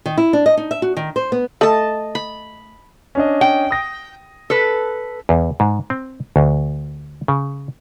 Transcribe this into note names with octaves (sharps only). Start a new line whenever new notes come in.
D#3
E4
D4
D#5
D#4
E5
F#4
D#3
C5
B3
A3 D#5 A5
B5
C#4 D4 D#5
G5
D#6 A#6
A4 B4
E2
G#2
C4
D2
C#3